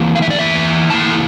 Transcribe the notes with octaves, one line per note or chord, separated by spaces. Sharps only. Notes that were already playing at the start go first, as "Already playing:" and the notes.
Already playing: E2 E3 A#3 E4
F5
E5
D5
E2 E3 A#3 E4 E5
E2 E3 A#3 E4 A5